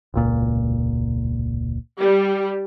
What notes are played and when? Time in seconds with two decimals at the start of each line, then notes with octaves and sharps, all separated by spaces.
0.14 E1 C#2 A#2
2.00 G3